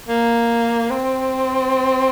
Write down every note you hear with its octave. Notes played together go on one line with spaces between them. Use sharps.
A#3
C4